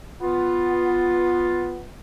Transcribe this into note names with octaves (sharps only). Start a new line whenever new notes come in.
B3 F4